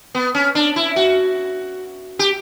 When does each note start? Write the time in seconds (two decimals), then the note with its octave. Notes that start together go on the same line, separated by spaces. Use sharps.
0.15 B3
0.35 C#4
0.55 D4
0.76 E4
0.96 F#4
2.19 G4